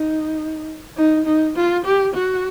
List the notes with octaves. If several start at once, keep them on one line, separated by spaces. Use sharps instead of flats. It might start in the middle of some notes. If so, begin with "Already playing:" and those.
Already playing: D#4
D#4
D#4
F4
G4
F#4